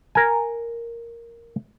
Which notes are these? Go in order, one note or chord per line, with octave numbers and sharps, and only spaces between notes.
A#4 G#5